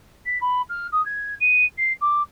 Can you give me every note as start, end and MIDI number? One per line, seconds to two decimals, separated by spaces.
0.26 0.38 95
0.41 0.62 83
0.69 0.87 89
0.92 1.04 87
1.05 1.35 92
1.40 1.65 99
1.78 1.93 96
2.01 2.22 86